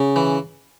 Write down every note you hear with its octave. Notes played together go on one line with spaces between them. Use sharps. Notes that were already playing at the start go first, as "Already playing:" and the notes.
Already playing: C#3
E3